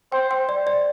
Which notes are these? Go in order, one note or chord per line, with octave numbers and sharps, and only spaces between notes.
C5 G5
G5
D5
D5